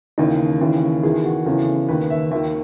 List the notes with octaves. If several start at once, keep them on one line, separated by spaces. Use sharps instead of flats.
D#2 C#3 E3 D#4
D#2 C#3 E3
E2 D#3 G#4
F#4
E2 C#3 E3 A4
D#2 D#3 B4
E5
D#2 D#3 E5